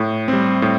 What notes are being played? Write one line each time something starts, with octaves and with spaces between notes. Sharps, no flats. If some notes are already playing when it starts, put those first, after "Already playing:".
Already playing: A2
G3 C4
A2